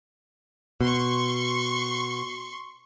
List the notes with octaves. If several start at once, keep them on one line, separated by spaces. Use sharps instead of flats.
B2 C6 C#6